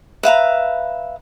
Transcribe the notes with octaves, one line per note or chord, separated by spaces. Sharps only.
B4 E5 F5 A#5